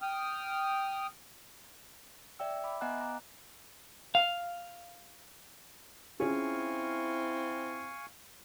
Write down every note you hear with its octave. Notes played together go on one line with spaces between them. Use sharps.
G5 D#6 F6
D5 E5 G5 E6
E5 B5 D6
B3 D#5 F#5 G#5 A#5 F#6
A#5 D6
F5
C4 C#4 E4 F4 G#4 F5 G#5 C#6